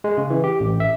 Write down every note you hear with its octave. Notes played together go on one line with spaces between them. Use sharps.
G#3
C#3
E3
G4
A1
E5